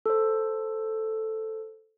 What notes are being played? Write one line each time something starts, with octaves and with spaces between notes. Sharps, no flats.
A4 C5